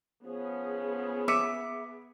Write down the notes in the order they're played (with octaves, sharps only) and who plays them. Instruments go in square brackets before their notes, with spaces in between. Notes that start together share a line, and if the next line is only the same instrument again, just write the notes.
[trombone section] F3 C#4 [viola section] B3 G#4
[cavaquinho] E5 [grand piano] D6 C#7 D#7